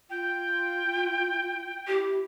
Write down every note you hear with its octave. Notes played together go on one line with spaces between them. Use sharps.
F4 G5
E4 G4